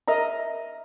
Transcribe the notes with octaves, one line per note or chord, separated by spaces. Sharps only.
A#4 D#5 E5 A#5